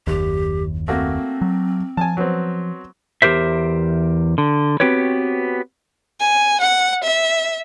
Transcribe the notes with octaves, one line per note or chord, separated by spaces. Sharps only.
F#1 D#2 G4
A3 A#3 C4 F#4
F#3
F3 G#5 A5
F#3 B3 C4
E2 G4 A#4 C5 E5
D3
B3 C4 F#4 G4 B4 C#5
G#5
F#5
E5